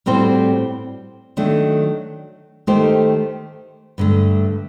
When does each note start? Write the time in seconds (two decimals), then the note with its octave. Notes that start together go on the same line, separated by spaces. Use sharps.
0.06 A2 G3 C4 F#4 C5
1.37 D#3 F#3 A3 D4
2.67 D#3 A3 D#4 G4 C5
3.98 G2 D3 A3